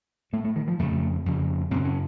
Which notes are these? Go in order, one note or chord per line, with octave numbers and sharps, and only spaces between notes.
A2 A3
A3
D#3
F3
F2 C#3 A3
F2 C#3
F#2 C#3 C4
C#4